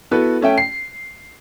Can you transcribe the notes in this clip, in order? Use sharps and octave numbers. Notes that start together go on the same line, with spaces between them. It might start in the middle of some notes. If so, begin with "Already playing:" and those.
B3 E4 F#4 A4 B4
A3 C#4 E5 G5
C7